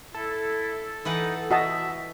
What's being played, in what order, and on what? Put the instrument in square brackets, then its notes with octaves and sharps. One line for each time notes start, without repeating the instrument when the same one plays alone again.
[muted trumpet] E4 [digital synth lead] A4
[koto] E3 B4 F#5 [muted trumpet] D#4
[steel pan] F#4 D#5 A5 [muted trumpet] E5